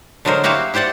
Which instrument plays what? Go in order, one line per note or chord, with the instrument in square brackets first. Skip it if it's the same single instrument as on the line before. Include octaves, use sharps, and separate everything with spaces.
[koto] D3 F#3 G#3 A#4 C5
A#3 E4 F#4 G4 C5 F5
E4 G4 C5 D5 F#5